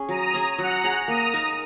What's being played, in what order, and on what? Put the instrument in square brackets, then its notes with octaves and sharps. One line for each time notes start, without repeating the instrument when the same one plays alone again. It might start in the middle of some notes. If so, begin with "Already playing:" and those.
Already playing: [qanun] C#4 G#4
[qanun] F#3 [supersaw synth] A#5 D#6
[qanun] C#4 G#4
[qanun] F#3 [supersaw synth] F#5 A#5
[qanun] C#4 G#4
[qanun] A#3 [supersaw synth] A#5 D#6
[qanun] D#4 A#4